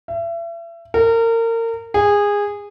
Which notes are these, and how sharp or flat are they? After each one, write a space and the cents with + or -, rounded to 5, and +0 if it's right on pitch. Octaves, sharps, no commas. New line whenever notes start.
E5 +35
A#4 -30
G#4 -20